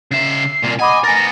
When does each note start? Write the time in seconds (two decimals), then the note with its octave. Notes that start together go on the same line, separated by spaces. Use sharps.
0.11 C#3 E5 C7
0.64 C2 A#2
0.80 D#5 F#5 G#5 B5 D6
1.04 B3 A#4 G#5 A6 A#6